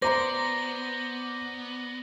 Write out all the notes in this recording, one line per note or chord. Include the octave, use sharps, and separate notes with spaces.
B3 C5 D5 A#5 C6 A#6